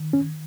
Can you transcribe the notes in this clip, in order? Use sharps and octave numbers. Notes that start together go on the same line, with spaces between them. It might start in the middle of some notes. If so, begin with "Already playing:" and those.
Already playing: D#3
C#4